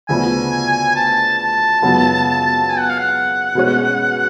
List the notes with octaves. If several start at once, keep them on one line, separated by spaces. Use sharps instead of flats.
D2 C#3 F3 B3 G#5
A5
A5
F#2 C#3 G#3 B3 F4
G#5
F#5
F5
F#5
B2 G#3 C#4